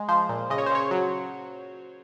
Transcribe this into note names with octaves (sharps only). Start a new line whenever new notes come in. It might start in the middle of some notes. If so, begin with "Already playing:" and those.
Already playing: G#3
F3 C5
A#2
C#3 D#5
C#5
C5
C#3 C#5
F#3